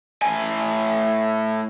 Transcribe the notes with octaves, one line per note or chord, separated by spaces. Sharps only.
A2 G#5